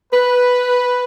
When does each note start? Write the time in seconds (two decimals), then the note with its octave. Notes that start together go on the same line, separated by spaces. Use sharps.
0.12 B4